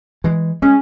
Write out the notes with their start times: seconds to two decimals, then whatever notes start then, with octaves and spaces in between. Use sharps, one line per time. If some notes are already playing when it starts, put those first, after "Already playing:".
0.24 E3 G#3
0.62 G#3 C#4